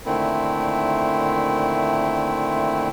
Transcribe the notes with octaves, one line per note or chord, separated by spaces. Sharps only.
A#2 D3 D#3 A3 C4 E4